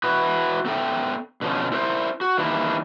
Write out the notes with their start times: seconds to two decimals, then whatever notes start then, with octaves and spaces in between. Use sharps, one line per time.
0.04 E4 F#4 B4
0.65 B3 A4 E5 G5
1.42 B2 D3 F3 C#4
1.72 E4 A#4 C5
2.21 F#4
2.38 D#3 E3 G3 A#3 D4 E4